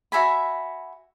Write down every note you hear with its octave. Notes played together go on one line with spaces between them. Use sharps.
F#4 E5 G#5 B5